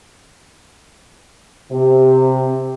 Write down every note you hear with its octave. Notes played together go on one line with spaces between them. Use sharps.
C3